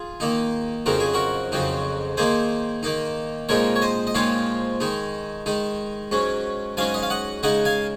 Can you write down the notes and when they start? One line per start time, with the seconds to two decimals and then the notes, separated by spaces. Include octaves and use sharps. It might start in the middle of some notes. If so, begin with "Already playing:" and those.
Already playing: F4 G#4
0.20 D#3 A#3 D#4
0.86 F2 C#3 F#3 C4 D#4 A#4
1.00 G#4
1.14 F#4 A#4
1.52 F2 C#3 F#3 C4 D#4
2.17 D#3 A#3 D#4 G#4 C5
2.83 D#3 A#3 D#4
3.49 A#2 F3 G#3 C4 D#4 A#4 C#5
3.76 C#5
3.82 C5 D#5
4.07 D#5
4.15 A#2 F3 G#3 C4 D#4 C#5 F5
4.80 D#3 G#3 D#4
5.46 D#3 G#3 D#4
6.11 G#2 F#3 C#4
6.77 G#2 F#3 C#4 F5 G#5
6.94 D#5
7.02 F5
7.10 D#5 F#5
7.43 C#3 G#3 D#4 D#5 F#5
7.65 F5 G#5